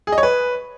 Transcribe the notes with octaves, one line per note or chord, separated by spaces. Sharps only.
G#4
D#5
C#5
B4